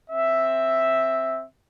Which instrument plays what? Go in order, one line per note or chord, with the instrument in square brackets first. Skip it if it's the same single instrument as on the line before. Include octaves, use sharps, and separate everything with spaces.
[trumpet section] C4 E5